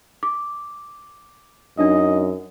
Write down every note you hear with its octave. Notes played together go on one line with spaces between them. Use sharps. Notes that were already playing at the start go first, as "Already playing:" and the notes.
D6
F#2 D4 D#4 D#5